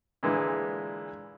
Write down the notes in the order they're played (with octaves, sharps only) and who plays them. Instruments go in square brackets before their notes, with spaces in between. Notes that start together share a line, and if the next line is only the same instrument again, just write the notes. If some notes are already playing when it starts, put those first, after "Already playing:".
[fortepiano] A#2 D3 E3 G#3